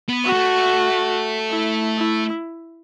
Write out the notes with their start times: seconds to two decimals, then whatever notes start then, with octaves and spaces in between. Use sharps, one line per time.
0.09 B3
0.24 F#4
0.32 A3
1.51 E4
1.97 E4